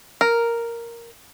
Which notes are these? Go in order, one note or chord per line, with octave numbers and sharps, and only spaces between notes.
A#4